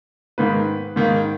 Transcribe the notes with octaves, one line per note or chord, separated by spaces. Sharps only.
G#2 D#3 A#3 B4
G#2 D#3 A#3